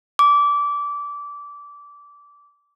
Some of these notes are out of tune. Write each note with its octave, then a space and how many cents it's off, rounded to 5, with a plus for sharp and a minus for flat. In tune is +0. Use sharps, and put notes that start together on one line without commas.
D6 -20